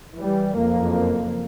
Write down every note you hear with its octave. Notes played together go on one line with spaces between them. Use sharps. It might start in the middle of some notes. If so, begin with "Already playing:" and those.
E3 G3
F#1 F2 A#3